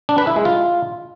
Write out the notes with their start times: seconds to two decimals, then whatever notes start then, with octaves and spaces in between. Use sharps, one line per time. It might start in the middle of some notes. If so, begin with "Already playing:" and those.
0.09 D4
0.18 B4
0.27 E4
0.36 G#3
0.45 F4